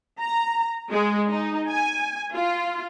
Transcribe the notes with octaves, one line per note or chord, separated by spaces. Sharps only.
A#5
G#3
D#4
G#5
F4